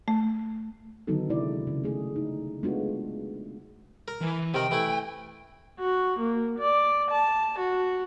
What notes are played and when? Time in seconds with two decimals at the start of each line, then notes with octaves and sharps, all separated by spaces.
0.08 A3
1.07 D3 D#3 F#3 B3 D#4 A4
1.30 C3 G#3 E4 D5
1.67 C#3
1.84 A3 G#4
2.16 D#4
2.63 G#3 A3 B3 D4 F4 F#4
4.08 A#4
4.22 E3
4.54 C3 D#3 A#4 G5
4.71 E3 A3 E4
5.80 F#4
6.19 A#3
6.59 D5
7.11 A5
7.59 F#4